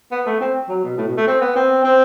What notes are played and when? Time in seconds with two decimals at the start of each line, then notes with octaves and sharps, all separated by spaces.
0.11 B3
0.26 A3
0.41 C4
0.69 F#3
0.84 B2
0.98 A2
1.08 B2
1.17 A3
1.27 C4
1.41 B3
1.56 C4
1.84 C4